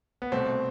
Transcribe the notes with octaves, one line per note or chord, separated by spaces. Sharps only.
B3
C2 B2 A3 C4